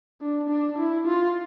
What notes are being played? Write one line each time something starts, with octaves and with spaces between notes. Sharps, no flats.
D4
D4
E4
F4